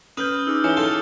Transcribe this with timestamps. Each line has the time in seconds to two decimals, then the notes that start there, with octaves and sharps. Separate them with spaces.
0.17 C#4 B4 D#6 F6 G6
0.47 D#4 G#4 D6 E6
0.64 E3 E4 G#4 C#5 C#7 G7
0.77 F4 A4 F6 G7